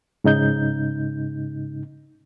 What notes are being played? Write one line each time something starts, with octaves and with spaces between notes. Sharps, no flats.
G#2 C#3 D#4 G6